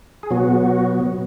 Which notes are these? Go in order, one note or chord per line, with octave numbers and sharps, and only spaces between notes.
G#4
B2 F#3 B3 F#4